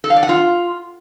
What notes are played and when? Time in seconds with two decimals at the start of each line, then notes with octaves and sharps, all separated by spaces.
0.04 A4
0.10 F5
0.16 D5
0.23 F#5
0.29 F4